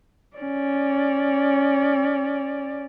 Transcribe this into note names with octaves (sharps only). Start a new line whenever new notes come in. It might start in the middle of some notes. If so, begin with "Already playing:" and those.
C#4 D5